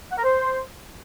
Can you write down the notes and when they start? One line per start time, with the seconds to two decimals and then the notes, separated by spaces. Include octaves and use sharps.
0.12 F#5
0.18 A#4
0.24 C5